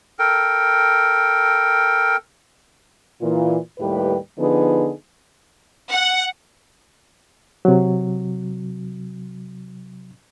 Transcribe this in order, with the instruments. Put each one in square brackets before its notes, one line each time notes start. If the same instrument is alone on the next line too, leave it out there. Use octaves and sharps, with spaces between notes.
[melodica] A4 A#4 G5
[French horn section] A#2 E3 F4
D#2 A2 G3 G4 B4
D3 F3 B3 D#4 G#4 B4
[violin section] F#5
[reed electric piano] C3 F#3